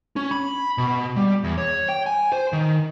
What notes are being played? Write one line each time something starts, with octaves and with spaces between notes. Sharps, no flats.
C#4
B5
B2
G3
E2
C#5
G5
G#5
C5
D#3